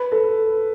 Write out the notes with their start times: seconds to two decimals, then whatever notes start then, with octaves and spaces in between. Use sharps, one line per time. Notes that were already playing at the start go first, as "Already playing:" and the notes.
Already playing: B4
0.12 A4